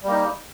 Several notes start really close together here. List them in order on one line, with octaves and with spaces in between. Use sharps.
G3 A#3 D#4